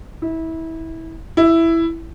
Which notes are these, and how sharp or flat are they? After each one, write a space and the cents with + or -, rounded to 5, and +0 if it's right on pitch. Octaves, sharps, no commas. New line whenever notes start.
E4 -25
E4 +5